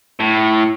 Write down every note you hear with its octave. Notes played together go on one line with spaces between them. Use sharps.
A2